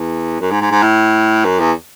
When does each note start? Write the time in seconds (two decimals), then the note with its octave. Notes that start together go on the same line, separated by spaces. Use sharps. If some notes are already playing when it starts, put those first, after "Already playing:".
Already playing: E2
0.40 F#2
0.51 G#2
0.61 G#2
0.71 G#2
0.82 A2
1.44 F#2
1.59 E2